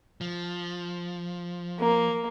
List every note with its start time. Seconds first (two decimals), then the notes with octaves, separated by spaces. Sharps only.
0.21 F3
1.79 A#3